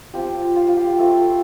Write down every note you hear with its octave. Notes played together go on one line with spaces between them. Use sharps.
F3 C4 F4 G4
F4
F4
G4
A3 C4 F4